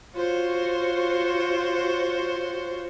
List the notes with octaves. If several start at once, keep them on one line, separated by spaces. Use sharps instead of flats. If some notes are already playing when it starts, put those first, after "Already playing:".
F4 F#4 C5 C#5